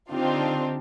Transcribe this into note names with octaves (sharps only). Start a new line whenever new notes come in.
D3 C4 D4 D#4 F4 G4